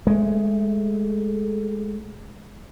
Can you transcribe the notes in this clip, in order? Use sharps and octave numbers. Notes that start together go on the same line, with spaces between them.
G#3 A3